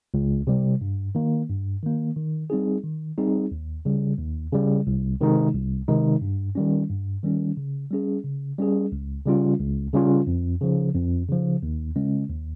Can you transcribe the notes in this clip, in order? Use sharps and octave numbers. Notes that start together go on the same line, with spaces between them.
C#2
C3 G3
G2
D#3 A#3
G2
D#3 A#3
D#3
G3 C4 D#4 G#4
D#3
G3 C4 D#4 G#4
D#2
C#3 G3
D#2
C#3 G3
C2
C3 D#3 G#3 D#4
C2
C3 D#3 G#3 D#4
G2
D#3 G3 C#4
G2
D#3 G3 C#4
C#3
G3 C#4 G#4
C#3
G3 C#4 G#4
C#2
C#3 G3 C#4 F4
C#2
C#3 G3 C#4 F4
F2
C#3 F3
F2
C#3 F3
D#2
C#3 G#3 C#4
D#2